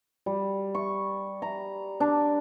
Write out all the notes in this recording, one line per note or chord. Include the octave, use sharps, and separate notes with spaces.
G3
C#6
A#5
D4